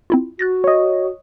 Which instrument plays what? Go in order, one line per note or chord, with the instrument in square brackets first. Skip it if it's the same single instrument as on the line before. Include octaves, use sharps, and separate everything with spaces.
[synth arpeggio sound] C4 E4 F4
[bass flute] F#4 [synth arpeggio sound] F#6 A6 A#6
[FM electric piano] C#5 D#5